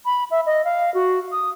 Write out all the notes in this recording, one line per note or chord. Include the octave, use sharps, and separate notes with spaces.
B5
E5
D#5
F5
F#4
D#6